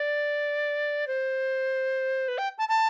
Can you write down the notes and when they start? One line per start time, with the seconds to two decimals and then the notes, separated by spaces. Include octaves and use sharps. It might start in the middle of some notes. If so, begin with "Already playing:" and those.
Already playing: D5
1.07 C5
2.28 B4
2.38 G5
2.58 A5
2.69 A5